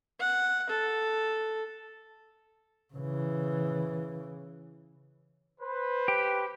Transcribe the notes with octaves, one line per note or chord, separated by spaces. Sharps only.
F#5
A4
C#3 E3
B4 C5
G4